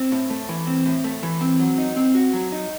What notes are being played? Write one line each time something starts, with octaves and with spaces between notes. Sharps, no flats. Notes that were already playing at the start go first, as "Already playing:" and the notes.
Already playing: C4
A2
A3
E3
C4
A2
A3
E3
C4
F#3
D#4
C4
F#4
F#3
D#4